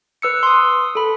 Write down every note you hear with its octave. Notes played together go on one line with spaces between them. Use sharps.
B4 E6 C#7
C6 D#6
A4 B5